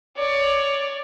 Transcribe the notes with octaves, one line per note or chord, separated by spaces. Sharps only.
C#5 D5